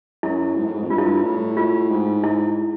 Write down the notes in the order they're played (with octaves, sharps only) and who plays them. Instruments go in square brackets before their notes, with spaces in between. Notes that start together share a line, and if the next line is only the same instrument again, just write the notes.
[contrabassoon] F#2 [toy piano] E4
[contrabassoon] G#2
A2
G#2
F2
[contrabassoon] G2 [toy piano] F4
[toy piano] E4
F4
[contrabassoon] A2
[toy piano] F4
[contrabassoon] G#2
[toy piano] E4